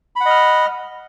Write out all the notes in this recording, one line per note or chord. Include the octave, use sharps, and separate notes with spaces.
D#5 F#5 B5 F6